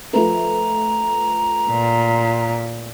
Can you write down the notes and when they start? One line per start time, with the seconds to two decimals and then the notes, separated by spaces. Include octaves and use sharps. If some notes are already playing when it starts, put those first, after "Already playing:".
0.13 F3 A3 B4 A#5
1.71 A#2